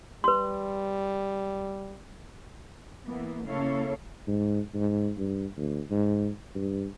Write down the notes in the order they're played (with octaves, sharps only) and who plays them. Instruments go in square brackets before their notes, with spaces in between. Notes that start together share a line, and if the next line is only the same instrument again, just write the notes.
[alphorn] G3 [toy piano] B4 C6
[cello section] E3 A#3 B3
C#3 A#3 E4 A4 C#5 F5
[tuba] G#2
G#2
G2
D2
G#2
G2